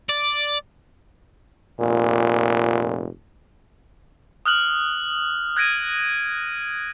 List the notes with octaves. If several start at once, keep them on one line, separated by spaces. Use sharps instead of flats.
D5
F1 A#2
D#6 F6 F#6 F#7
F#6 G#6 A#6 D7 D#7